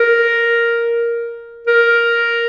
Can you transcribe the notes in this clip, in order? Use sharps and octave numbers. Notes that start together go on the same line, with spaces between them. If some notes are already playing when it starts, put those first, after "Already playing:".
Already playing: A#4
A#4